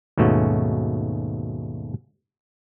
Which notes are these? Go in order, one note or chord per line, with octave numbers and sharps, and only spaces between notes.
D#2 G#2 B2 A3 C#4 F#4